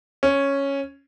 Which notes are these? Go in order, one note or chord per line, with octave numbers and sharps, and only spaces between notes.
C#4